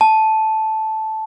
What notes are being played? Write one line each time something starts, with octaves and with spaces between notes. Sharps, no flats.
A5